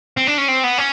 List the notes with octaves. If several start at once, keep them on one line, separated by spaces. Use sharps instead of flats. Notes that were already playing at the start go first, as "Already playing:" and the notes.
C4
D4
C#4
C4
B3
C#4